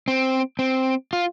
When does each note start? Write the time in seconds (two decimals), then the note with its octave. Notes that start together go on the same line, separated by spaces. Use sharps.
0.08 C4
0.59 C4
1.13 F4